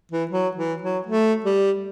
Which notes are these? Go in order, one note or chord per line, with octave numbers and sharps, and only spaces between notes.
E3
F#3
E3
F#3
A3
G3